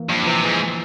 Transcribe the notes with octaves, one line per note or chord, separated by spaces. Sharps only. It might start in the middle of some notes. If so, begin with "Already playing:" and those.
Already playing: E3 A#3
G2 F3
F3
C3 E3
G#2 E3